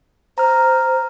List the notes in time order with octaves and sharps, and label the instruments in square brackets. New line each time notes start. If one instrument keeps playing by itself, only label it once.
[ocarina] C5 [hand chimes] A#5 F6